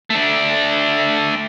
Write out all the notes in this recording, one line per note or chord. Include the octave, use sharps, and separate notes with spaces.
A3 D4